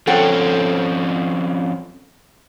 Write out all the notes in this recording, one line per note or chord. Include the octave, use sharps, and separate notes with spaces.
F3 C4 C#4 A4 F#5 G5